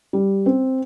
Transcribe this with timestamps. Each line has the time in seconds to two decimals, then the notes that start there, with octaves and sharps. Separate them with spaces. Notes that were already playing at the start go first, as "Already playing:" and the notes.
0.13 G3
0.46 C4